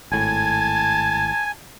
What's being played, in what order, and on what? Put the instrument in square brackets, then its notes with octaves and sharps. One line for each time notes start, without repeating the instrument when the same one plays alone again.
[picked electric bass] G#1 A2 [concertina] G#5 [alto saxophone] A5 [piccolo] G#6